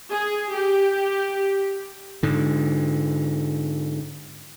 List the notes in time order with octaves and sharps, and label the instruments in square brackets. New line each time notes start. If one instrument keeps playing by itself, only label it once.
[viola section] G#4
G4
[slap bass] G#2 D3